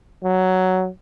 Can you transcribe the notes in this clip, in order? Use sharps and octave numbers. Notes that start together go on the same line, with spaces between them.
F#3